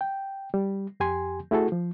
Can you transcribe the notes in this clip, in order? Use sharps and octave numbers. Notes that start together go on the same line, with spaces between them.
G5
G3
F2 G4 G#5 C6
A3 E4 F#4 G#4 A4
F3